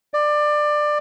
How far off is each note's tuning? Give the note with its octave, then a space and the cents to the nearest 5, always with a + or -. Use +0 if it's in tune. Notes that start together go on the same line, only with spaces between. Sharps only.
D5 +20